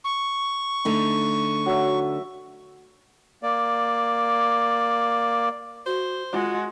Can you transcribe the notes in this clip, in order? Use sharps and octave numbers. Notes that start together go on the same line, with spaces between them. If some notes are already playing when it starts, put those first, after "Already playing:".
C#6
D3 A3 D#4
F#3 E5
A#3 D5
F#4 C5
G#3 F4 F#4